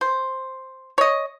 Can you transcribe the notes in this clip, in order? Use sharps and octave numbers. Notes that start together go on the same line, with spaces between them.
C5
C#5 D#5